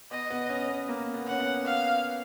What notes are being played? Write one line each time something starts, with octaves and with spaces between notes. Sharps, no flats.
B3 D#5
B3
C#4
B3
A#3
B3
C#4 F#5
B3
F5